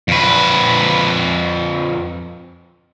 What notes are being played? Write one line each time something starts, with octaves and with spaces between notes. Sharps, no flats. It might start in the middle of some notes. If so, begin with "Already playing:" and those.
F2 B4